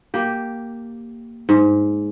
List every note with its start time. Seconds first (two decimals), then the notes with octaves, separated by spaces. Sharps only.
0.14 A#3 G4
1.49 G#2